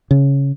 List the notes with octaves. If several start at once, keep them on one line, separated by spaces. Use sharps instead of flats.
C#3